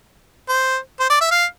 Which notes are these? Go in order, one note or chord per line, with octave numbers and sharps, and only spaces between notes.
C5
C5
D5
E5
F5